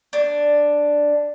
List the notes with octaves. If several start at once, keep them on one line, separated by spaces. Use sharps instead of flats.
D4